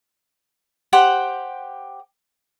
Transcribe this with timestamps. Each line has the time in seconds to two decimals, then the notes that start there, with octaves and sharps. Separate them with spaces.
0.93 G4 C5 F#5